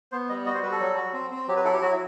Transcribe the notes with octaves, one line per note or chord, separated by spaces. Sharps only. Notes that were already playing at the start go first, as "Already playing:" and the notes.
B3 C5
G3 D#5
F#4 D#5
C5
G3 B4
A4
F#3
F#4
C4
C4
F#3 G4
B4
E4 A4
G4
F#3 F#4